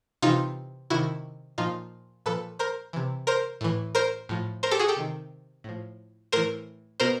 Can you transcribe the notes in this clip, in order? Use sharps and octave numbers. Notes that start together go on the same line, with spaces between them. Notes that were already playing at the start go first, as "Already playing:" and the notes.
C3 E3 D#4 F4
C3 D#3 E4 F#4
A#2 F3 D#4 F4
A#2 F3 A4 B4
A#4 C5
C3 E3
A#4 C5
A2 E3
A#4 C5
A2 F3
A#4 C5
G4 A4
F#4 G#4
G4 A4
C3 D#3
A2 F3
A2 E3 A#4 C5
B2 A#4 C5